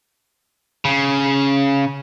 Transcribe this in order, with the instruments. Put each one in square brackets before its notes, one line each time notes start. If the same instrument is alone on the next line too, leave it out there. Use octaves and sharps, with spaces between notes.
[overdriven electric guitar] C#3